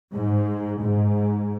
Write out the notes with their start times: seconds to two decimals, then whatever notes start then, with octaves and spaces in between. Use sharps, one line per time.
0.13 G#2
0.83 G#2